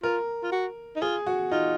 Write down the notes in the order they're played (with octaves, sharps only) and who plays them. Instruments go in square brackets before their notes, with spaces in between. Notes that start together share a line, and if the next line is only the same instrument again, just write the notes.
[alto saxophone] F4 [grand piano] A#4
[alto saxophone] F4
F#4
D#4
[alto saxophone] F4 [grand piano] G#4
[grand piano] F#4
[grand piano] D#4 [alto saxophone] F4